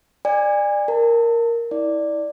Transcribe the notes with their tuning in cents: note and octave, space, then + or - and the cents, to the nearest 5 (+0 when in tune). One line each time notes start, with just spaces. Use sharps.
D5 +20 G#5 -35
A#4 +0 A5 +30
E4 -35 D5 +0